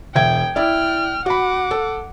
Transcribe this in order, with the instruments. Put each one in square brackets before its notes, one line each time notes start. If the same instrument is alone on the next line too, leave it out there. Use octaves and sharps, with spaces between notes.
[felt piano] E1 E5 G#6 [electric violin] G5
[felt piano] E4 D5 [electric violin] G5 F6
[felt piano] F#4 B5 [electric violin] F#5 D6
[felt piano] A4